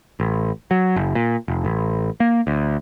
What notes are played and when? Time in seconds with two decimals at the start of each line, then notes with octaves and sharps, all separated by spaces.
0.20 A1
0.71 F#3
0.96 F#1
1.15 A#2
1.48 F1
1.65 A1
2.20 A#3
2.47 D2